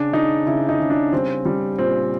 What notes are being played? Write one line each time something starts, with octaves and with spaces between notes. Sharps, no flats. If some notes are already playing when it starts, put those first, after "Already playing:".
Already playing: C#3 D4
C#3 D#4
C#3 E4
D#4
C#3
D4
G3 C4
G3
A#2 C4